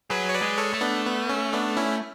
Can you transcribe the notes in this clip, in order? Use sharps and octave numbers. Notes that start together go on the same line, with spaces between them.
F#3 G#4 B4
C#5
B4 D5
G#3
A4 C#5
A3
B3 D4
B3
C#4
B3 D4
C#4 E4